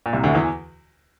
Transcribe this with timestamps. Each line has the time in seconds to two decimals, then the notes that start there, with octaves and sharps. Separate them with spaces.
0.06 A#2
0.13 C2 C3
0.24 D2 D3
0.34 E2 E3